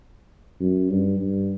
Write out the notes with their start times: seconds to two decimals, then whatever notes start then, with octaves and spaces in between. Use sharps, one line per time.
0.60 F#2
0.90 G2
1.20 G2